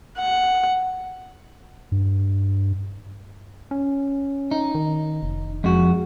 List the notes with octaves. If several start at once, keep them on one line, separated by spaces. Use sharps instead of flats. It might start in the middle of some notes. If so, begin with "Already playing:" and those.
F#5
G2
C#4
D#4
D#3
F1
F2 G#3 F#4